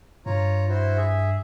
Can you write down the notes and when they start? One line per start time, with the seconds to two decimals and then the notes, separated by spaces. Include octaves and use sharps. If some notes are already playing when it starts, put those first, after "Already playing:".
0.26 G2 F4 C#5 A#5
0.69 E4 F#4 C5
0.97 G#4 E5